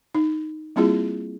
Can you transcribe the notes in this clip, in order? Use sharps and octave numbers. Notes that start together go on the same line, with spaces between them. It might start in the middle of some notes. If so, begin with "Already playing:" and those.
D#4
G3 A#3 C4 E4 F4 G#4